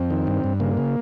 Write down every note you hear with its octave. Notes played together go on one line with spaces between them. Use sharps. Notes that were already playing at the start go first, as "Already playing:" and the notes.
Already playing: F2 C4
D#3
G2
G2
C#3 A#3
C#3